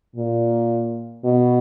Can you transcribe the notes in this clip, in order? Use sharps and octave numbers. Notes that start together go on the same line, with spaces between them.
A#2
B2